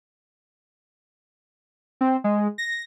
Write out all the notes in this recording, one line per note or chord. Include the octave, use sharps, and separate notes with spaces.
C4
G#3
A#6